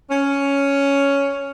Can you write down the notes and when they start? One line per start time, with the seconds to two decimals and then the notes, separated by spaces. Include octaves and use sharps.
0.10 C#4